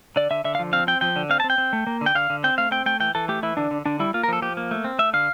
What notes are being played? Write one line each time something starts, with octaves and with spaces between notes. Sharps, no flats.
D3 D5
D3 E5
D3 E5
F5
F3
C4 F5
C4 G5
F3 G5
D3
C4 F5
A5
C4
G5
C4
A3
A#3
D3
G5
D3 F5
D3
C4 G5
A3 F5
C4 G5
A3 G5
E3 G5
E3 A4
A3 G4
E3 E4
D3 D4
D3
D3 D4
G3 E4
A#3 F4
A#4
F3 A4
F3 G4
A#3
A3
C4
A3 E5
D3 F5